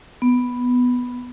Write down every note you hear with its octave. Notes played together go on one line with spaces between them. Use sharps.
B3